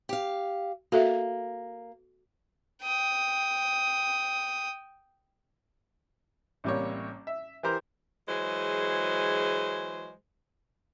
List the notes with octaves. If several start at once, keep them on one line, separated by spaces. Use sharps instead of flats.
G4 F5
A#3 F#4 A4 E5
G5 D#6
A1 C3 G3 A#3 C#5
E5
E3 G4 A#4 C5 A#5
E3 F#3 G#3 G#4 C5